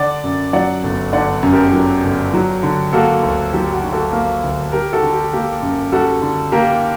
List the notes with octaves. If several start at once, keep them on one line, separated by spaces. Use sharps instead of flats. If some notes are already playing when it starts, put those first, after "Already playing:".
Already playing: D3 D5 F#5
F#2
F#3 D5 F#5
G1
D3 D5 F#5
F#2
G4 A#4
F#3
G1
F#3
D3
A#3 F#4 A4
D2
F#3 G4
F#4
D3
F#4 A4
A#3
D2
G3 G4 A#4
F#4 A4
D3
G4
A#3 G4
F#2
G3 F#4 A4
D3
A#3 G4 A#4